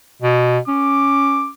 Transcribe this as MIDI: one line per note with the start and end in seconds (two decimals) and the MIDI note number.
0.22 0.59 47
0.68 1.50 61
0.68 1.51 86